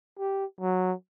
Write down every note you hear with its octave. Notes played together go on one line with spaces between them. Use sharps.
G4
F#3